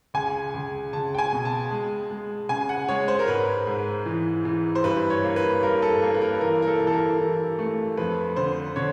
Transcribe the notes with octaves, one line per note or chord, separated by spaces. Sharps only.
C#2 G#5
C#2
C#2 A5
G5
G#5
B2
A5
G#3
G#3
C#3 G#5
F#5
G#3 C#5
C5
A#4
G#2 B4
G#2
E3
E3
C5
G2 B4
C#5
A#3
B4
G2 A#4
A4
A#3
B4
A#4
E3 A#4
A#4
A4
E3
A4
A#4
E3
A3
F2 B4
D3 C5
D3 C#5